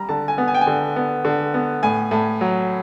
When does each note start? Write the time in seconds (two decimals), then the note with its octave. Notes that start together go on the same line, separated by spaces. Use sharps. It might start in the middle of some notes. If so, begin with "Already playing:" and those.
Already playing: G3 A#5
0.09 D3 A5
0.28 G#5
0.38 B3
0.48 G#5
0.54 G5
0.61 G#5
0.67 D3
0.96 B3
1.25 D3
1.54 B3
1.83 A2 G#5
2.11 A2 A5
2.41 F#3